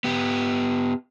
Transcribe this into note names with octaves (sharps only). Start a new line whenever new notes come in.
B3 G4